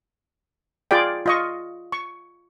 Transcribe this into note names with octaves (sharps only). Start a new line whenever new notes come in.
F4 G#4 D5 G5
F4 D#5 C#6
C#6